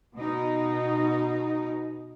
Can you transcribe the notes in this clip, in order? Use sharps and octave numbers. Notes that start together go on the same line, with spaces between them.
B2 D#4